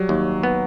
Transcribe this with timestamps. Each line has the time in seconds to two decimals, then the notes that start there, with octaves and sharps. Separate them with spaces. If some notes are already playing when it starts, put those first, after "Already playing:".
Already playing: F#3 G3
0.09 D#2
0.43 B3